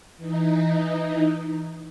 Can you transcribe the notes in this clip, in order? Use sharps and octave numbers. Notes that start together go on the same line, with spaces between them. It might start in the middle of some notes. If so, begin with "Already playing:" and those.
E3 D#4